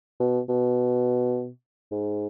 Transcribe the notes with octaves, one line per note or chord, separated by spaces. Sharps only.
B2
B2
G#2